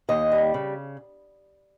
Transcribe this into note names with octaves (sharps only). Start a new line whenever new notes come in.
D#2 D#5
G3
C#3